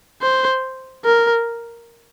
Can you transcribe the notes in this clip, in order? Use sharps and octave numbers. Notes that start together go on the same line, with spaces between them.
C5
A#4